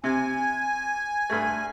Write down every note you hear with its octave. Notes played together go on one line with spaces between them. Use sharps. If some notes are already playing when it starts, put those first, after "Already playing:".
C3 G#5
G2 A3